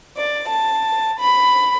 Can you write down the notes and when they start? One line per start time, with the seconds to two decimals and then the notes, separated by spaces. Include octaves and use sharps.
0.15 D5
0.47 A5
1.19 B5